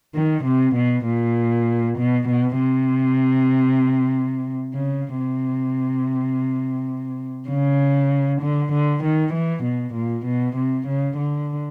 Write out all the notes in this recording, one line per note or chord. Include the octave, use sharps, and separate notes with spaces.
D#3
C3
B2
A#2
B2
B2
C3
C#3
C3
C#3
D3
D3
D#3
E3
B2
A#2
B2
C3
C#3
D3